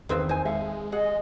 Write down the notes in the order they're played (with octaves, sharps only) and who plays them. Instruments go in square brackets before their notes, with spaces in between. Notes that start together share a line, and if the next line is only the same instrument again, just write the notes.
[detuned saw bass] E2 [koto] D#3 C4 E5 [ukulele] G#4 B4 F5
[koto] D#4 [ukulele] C5 G#5
[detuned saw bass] G#3 [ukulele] A4 E5 F5
[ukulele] G#4 [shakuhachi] D#5 [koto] F#5